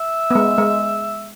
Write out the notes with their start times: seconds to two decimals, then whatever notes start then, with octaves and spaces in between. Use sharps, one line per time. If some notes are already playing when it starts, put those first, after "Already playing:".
Already playing: E5
0.31 B3
0.35 G#3
0.58 G#3